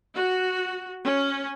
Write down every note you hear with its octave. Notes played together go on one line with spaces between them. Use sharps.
F#4
C#4